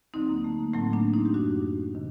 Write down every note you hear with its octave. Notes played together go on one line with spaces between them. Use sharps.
D2 D3 F#3 C4 D#4
A#3
A3
A#3
A2 F#3 A3 C4
A#3 D4
C4 D#4
G4
F#2 F#3 D4 F#4
C3 D#3